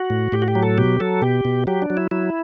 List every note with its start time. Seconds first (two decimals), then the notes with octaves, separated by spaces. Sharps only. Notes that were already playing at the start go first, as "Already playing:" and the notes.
Already playing: F#4
0.10 A2
0.32 A2 G4
0.42 F#4
0.48 G4
0.55 F#3
0.63 A4
0.78 B2 G4
1.00 F#3 A4
1.22 B2 G4
1.45 B2
1.67 F#3 G4
1.82 D4
1.90 F#3
1.97 E4
2.11 F#3 E4